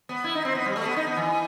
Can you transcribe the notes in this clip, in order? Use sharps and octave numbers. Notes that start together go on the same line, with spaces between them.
B3
E4
D#4
C4
B3
G3
A3
B3
D#4
B3
E3